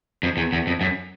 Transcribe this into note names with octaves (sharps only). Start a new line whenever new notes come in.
F2
E2
E2
F2
F#2